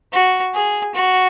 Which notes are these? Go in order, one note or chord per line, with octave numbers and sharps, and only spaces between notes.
F#4
G#4
F#4